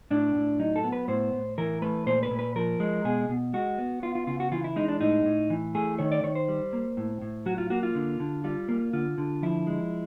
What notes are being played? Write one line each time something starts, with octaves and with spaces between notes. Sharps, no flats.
A2 D4
A2
F#3 D#4
A4
B3
B4
A2 C5
A2
E3 A#4
A3 B4
A#2 C5
B4
A#2
B4
F3 A#4
G#3
B2 G#4
B2
G#3 F#4
B3
B3 F4
F4
C#3 F4
F#4
E3 F4
E4
G#3 D#4
D4
A2 D#4
A2
E3
A3 G#4
D#3 C#5
D5
D#3 C#5
C5
G3
A#3
A2
A2
F#3 F#4
F4
A#3 F#4
F4
D3
D3
G3 F4
A#3
D3 F4
D3
F3 E4
G#3